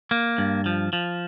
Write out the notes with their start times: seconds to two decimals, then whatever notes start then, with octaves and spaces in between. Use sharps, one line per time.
0.11 A#3
0.38 G2
0.66 F3
0.93 F3